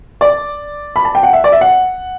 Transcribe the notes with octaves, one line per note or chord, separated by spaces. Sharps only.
D5
B5
A5
G5
F#5
E5
D5
E5
F#5